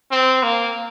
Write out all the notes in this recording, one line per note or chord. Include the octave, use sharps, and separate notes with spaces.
C4
A#3